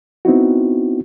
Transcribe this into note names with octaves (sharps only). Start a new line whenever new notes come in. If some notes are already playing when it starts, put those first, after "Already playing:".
B3 C4 D#4 E4 F#4